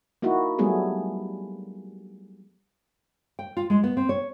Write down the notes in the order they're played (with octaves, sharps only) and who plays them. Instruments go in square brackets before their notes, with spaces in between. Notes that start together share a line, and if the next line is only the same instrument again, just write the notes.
[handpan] A#3 D#4 E4 F#4
F#3 G3 A3 B3 G#4
[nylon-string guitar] G5
F4
G#3
B3
C4
C#5